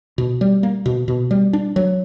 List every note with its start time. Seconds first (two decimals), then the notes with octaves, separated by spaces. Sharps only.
0.18 B2
0.41 G3
0.63 A#3
0.86 B2
1.08 B2
1.31 G3
1.53 D4
1.76 F#3